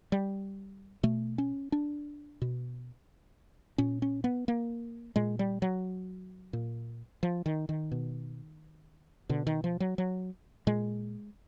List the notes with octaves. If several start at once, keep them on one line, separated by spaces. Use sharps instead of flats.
G3
B2 A3
C#4
D4
B2
A#2 C#4
C#4
B3
A#3
A#2 G#3
G3
F#3
A#2
F3
D#3
D#3
B2
B2 D3
D#3
F3
F#3
F#3
A#2 G#3